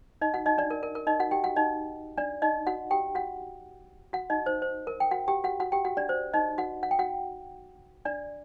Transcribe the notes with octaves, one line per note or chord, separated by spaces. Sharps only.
D#4 D#5
F#4 F#5
D#4 D#5
D4 D5
A#4
A#4
A#4
D#4 D#5
F#4 F#5
G4 G5
F#4 F#5
D#4 D#5
D4 D5
D#4 D#5
F#4 F#5
G4 G5
F#4 F#5
F#4 F#5
D#4 D#5
C5
C5
A#4
G5
F#4 F#5
G4 G5
F#4 F#5
F#4 F#5
G4 G5
F#4 F#5
D4 D5
C5
D#4 D#5
F#4 F#5
F#5
G5
F#4 F#5
D4 D5